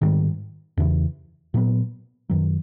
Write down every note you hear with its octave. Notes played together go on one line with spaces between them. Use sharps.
G#2 D#3 G3
E2 C#3 E3
A#2 F#3 B3
F#2 D#3 F#3